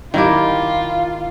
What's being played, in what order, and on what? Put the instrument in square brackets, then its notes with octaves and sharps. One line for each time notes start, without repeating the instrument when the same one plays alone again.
[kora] D#3 E4 G4 [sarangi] F4